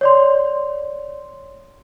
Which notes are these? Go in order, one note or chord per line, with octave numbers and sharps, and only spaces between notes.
C#5 D5 C6